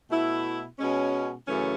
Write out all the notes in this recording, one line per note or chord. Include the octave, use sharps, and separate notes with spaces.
B2 A3 E4
B2 G#3 C#4
F#2 C#3 E3 A3 C#4